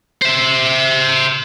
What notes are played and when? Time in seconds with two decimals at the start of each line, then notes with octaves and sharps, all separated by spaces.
0.22 C5 E5